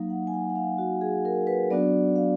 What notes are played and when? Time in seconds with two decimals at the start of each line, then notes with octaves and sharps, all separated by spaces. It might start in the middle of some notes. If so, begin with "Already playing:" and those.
Already playing: F#3 A#3 D#4 F5
0.10 F#5
0.27 G#5
0.34 F#5
0.50 F#5
0.56 F5
0.78 F#4
1.01 G#4
1.25 A#4
1.47 B4
1.70 F#3 B3 D4 F#4 D5
2.16 F5